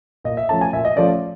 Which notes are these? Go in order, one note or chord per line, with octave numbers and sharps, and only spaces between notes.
A#2 D#5
E5
F3 A3 C#4 A5
G#5
A#2 E5
D#5
F3 A3 C#4 D5